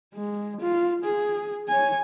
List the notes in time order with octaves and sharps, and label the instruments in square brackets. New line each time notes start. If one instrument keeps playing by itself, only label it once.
[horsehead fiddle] G#3
F4
G#4
C#5 G#5